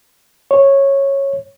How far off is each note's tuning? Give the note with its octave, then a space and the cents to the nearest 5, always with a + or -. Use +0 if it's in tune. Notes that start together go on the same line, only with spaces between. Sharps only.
C#5 -10